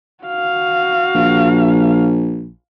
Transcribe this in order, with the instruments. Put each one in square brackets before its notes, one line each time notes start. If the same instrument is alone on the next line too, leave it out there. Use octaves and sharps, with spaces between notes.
[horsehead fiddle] F#4 F5
[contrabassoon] A#1